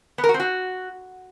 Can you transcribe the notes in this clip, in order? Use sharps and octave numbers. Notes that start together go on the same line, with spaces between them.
B3
A#4
F#4
C4
F#4